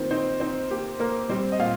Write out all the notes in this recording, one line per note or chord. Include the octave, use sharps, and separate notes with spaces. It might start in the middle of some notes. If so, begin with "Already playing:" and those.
Already playing: D#3 A#3 C4 F4 C5
C4 D#4 C5
C4 D#4 C5
A#3 G4
A#3 A#4
G3 C4 C5
D#5
A#2 F4 F5